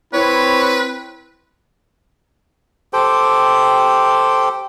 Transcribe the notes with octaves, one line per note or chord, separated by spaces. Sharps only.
C4 E4 B4 C#5
G4 A4 C5 G5